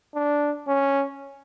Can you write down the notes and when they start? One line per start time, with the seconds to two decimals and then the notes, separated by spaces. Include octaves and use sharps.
0.15 D4
0.68 C#4